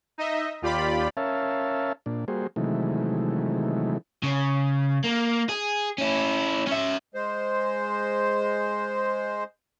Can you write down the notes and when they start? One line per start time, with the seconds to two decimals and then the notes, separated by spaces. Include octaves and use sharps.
0.18 D#4 D#5 E5
0.62 D#2 F4 G4 D5 B5
1.17 C#4 A#4 C#5 E5 F5 A5
2.06 A#2 D4
2.28 G3 A#3 F#4 G#4 C5
2.56 C3 D#3 E3 F#3 G#3 A3
4.23 C#3
5.04 A#3
5.49 G#4
5.98 C#4 E4
6.68 C#4 E5
7.14 G#3 C5